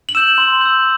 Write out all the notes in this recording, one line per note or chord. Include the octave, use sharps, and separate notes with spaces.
F#7
E6 G6 E7
C6
E6 G6